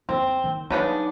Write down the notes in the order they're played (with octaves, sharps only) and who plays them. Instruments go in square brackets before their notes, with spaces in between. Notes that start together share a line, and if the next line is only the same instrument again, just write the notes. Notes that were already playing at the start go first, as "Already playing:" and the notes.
[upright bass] F2 [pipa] C4
[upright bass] D#3
[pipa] C#3 B3 D4 [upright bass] F#3 D#4